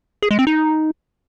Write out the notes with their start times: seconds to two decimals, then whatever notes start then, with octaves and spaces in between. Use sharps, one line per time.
0.22 G#4
0.31 G#3
0.39 C4
0.47 D#4